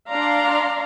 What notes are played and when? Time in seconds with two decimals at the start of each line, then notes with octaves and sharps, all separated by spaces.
0.11 D4 D5 F5 A#5 C6